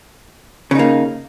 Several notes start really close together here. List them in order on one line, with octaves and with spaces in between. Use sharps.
C#3 D#4 A#3